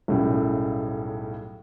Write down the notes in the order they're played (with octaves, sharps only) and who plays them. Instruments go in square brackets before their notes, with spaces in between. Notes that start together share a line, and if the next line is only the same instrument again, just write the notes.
[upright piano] B1 F#2 A2 C#3 G3